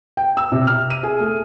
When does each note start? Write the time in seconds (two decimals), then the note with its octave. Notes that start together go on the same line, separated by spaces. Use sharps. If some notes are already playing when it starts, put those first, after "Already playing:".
0.17 G5
0.37 E6
0.52 C3
0.67 F6
0.90 D#7
1.03 G#4
1.20 A3